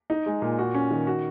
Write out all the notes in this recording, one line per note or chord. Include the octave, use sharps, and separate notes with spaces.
D#4
G#3
A#2
F#4
C#4
D#3
F#4